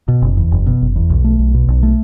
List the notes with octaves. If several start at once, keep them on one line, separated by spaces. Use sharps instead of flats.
B2
F#1
E2
F#1
B2
F#1
E2
B1
A3
B1
B2
B1
A3